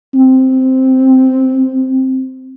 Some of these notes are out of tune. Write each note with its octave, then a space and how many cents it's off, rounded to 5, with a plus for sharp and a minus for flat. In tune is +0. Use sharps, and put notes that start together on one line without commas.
C4 +0